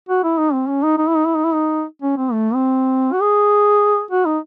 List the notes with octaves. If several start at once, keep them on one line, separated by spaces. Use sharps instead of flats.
F#4
E4
D#4
C4
C#4
D#4
D#4
E4
D#4
E4
D#4
E4
D#4
C#4
C4
A3
C4
F#4
G#4
F#4
D#4